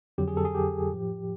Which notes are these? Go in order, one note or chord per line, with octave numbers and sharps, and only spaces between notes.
F2 D3 F#3 G4
G#4
A4
G#4
G4
A2 F3